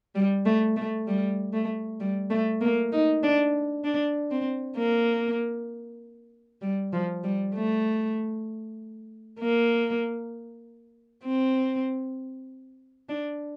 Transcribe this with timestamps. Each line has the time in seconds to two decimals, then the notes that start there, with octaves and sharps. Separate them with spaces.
0.15 G3
0.46 A3
0.76 A3
1.07 G3
1.53 A3
2.00 G3
2.30 A3
2.61 A#3
2.92 D#4
3.23 D4
3.84 D4
4.31 C4
4.77 A#3
6.62 G3
6.93 F3
7.24 G3
7.54 A3
9.40 A#3
11.24 C4
13.09 D4